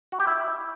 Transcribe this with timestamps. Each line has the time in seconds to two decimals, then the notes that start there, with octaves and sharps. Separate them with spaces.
0.12 F#4
0.20 G4
0.27 E4